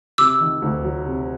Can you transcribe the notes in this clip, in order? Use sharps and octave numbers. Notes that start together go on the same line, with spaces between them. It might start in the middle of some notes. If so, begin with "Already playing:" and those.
C3 D6 E6
D#3
D2
F#3
C3